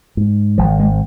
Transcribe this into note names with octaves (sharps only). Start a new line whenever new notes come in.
G#2
G#1 F3
G#3